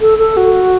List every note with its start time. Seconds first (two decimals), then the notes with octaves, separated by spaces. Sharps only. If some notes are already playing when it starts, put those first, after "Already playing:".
0.01 A4
0.19 A4
0.37 F#4